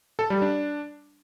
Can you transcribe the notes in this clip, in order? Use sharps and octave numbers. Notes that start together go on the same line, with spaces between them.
A4
G3
D4